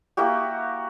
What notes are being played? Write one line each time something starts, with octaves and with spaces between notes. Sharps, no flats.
A#3 E4 F#4 G4